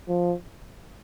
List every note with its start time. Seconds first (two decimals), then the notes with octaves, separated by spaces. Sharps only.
0.08 F3